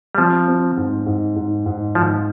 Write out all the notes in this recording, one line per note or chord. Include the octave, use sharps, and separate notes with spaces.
G3
F3 C4
C4
G#2
G#2
G#2
G#2
G#2 F3